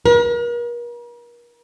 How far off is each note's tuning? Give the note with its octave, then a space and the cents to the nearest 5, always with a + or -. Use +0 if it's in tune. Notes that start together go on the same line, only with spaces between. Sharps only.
A#4 +40